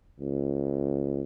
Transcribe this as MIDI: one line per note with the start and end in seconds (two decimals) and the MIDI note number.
0.20 1.22 37